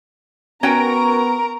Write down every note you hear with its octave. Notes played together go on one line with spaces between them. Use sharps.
B3 C#4 F#4 A#4 G5 A#5